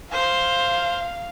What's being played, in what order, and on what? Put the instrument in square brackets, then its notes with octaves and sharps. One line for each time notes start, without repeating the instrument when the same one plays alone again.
[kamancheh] C5 [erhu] F5